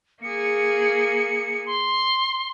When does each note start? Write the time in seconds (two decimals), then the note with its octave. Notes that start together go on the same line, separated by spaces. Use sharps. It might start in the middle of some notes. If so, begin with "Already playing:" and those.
0.22 A#3 G#4 C#7
1.66 C6